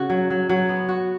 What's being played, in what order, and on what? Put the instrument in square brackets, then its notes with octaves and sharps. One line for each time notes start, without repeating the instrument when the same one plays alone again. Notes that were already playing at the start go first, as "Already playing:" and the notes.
Already playing: [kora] C#3 C#4 F#4
F#3
F#3
F#3
B3
F#4